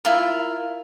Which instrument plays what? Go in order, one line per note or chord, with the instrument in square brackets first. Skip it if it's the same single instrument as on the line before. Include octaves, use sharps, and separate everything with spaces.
[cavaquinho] E4 F4 A#4